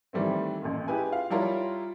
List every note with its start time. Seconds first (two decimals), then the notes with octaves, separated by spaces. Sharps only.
0.13 D#3 E3 G3 A3 C4
0.62 A1 F#2 A#2
0.88 E4 G4 G#4 B4 G#5
1.10 F4 F5
1.30 G3 E4 F4 A#4 C#5